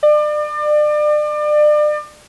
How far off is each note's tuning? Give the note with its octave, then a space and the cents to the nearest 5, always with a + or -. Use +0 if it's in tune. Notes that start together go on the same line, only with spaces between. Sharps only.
D5 +35